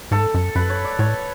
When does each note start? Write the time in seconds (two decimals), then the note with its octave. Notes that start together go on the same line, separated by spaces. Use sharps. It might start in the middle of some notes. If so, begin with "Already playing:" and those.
0.11 G#2 A4
0.34 F#2
0.55 F#2 B4
0.70 C#5
0.84 D5
0.99 A2 C#5